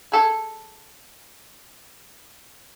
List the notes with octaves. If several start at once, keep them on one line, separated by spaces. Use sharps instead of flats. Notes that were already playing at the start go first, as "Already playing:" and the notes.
G#4 A4